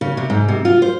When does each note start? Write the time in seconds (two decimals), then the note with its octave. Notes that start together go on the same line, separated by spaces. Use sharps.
0.01 C#3
0.17 C3
0.30 G#2
0.48 C3
0.65 F4
0.82 C5